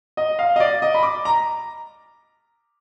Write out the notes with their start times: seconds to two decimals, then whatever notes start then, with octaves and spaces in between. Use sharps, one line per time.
0.17 D#5
0.39 F5
0.56 D#5
0.60 D5
0.82 D#5
0.94 B5
1.03 D6
1.25 A#5